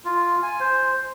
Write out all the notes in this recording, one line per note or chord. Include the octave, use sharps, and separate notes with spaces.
F4
G#5
C5